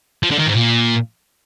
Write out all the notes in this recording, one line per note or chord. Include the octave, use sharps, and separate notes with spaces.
F3
D3
D#3
G#2
A#2